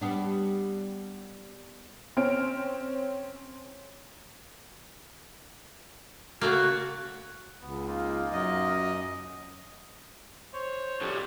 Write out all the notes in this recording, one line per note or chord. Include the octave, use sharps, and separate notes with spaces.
G3 B3 D4
C4 C#4 F6 D7
C#3 A3 A#3 F#4
C#2 B3
A#3 D#4 F4
F#2 D#5
C5 C#5
F2 G3